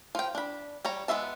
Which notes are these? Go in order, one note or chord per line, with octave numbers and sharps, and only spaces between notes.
F3 G5
D4 B5
G3 C#5 A#5
G#3 B3 F4 E5 A5